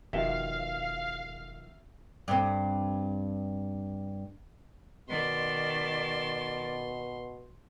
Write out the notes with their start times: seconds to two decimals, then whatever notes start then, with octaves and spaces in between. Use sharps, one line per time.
0.13 E1 B2 D#3 F3 F#4 E5 F5
2.28 G2 C4
5.09 B2 D#3 D5 C6